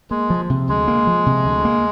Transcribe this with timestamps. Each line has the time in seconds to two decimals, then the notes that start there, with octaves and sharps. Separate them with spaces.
0.10 G#3 A#3
0.30 F3
0.50 C3
0.69 D2 G#3
0.88 A#3
1.07 F3
1.26 C3
1.46 D2
1.65 A#3